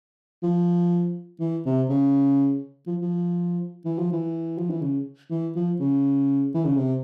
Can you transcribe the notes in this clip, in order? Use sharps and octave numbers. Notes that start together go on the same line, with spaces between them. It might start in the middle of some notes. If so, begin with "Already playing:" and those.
F3
E3
C3
C#3
F3
F3
E3
F3
E3
F3
E3
C#3
E3
F3
C#3
E3
C#3
C3